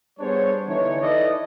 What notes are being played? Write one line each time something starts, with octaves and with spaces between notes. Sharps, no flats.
G3 B3 D4 G#4 C5 C#5
D3 E3 D4 D#4 C#5
D#4 E4 A4 B4 D5 D#5